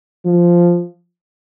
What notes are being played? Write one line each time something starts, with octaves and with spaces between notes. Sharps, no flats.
F3